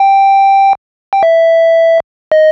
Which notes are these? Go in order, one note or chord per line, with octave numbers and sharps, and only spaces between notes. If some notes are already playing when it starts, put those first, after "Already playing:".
Already playing: G5
G5
E5
D#5